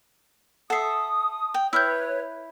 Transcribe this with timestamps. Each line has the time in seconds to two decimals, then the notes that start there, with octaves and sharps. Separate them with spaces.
0.70 A4 E5 F#5 D#6 C7
1.54 G5
1.73 E4 B4 C#5 E6 F6 G6